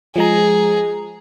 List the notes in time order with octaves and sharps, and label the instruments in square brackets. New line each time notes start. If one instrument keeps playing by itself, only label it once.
[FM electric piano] F3 G#3 A#5 [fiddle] G#4